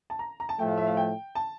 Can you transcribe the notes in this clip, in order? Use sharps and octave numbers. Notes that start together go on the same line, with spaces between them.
A5
A#5
A#5
A5
A2 F3 A3 G5
F5
E5
F5
G5
A5